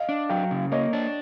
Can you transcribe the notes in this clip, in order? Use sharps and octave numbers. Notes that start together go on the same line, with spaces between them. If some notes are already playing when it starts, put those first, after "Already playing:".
Already playing: D#5 F5
D4
F#3 F5 G5
C#3
A#3 C#5 D#5
D4